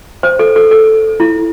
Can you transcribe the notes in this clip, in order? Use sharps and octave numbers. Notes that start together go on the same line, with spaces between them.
C5
A4
A4
A4
E4